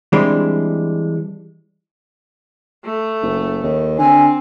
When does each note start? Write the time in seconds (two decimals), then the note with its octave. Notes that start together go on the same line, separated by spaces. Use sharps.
0.13 E3 G3 G#3 C4 D4
2.85 A3
3.22 F#1
3.63 D#2
3.99 D3 C4 G#5